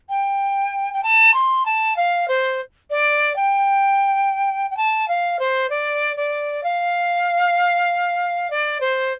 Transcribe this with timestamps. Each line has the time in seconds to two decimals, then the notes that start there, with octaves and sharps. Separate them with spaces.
0.09 G5
0.94 G5
1.03 A5
1.34 C6
1.66 A5
1.96 F5
2.28 C5
2.90 D5
3.36 G5
4.71 G5
4.77 A5
5.08 F5
5.39 C5
5.70 D5
6.17 D5
6.64 F5
8.50 D5
8.81 C5